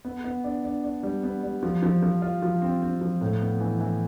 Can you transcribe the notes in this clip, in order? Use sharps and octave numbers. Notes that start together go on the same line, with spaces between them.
B3
B3
D4
D4
D4
G3
B3
G3
F3
F3
F3
F4
F3
C4
C4
F3
A2
B3
E3
E3